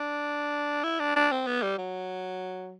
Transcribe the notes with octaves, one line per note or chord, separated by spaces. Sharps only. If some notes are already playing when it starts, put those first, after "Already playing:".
Already playing: D4
E4
D4
D4
C4
B3
G3
F#3